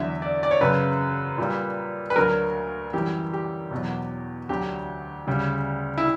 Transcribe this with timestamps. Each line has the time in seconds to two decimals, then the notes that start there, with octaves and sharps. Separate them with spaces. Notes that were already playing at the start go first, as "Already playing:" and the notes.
Already playing: E2 D3 F#3 E5
0.22 D5
0.43 D5
0.51 C#5
0.61 F#2 C#3 F#3 B4
1.38 A#2 G3
2.10 B4
2.16 D2 D3 F#3 A#4
2.93 F#2 E3 G3 G4
3.33 G4
3.71 E2 B2 F#3
4.49 D2 D3 F#3 G4
5.27 D2 C#3 G3
5.98 E4